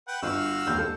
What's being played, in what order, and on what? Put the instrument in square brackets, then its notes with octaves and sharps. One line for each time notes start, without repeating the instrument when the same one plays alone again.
[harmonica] B4 F#5 G5
[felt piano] G1 [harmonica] F#4 F5 E6
[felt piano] E1 D#2 G6
A4